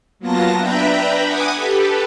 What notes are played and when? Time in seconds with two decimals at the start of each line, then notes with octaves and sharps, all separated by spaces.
0.19 F#3 A#3 B3 F4 A5 A#6
0.57 D4 B4 E5 G5 A#5 B5
1.23 F#5 G#5 D6 D#6 G#6
1.54 G4 A4 B4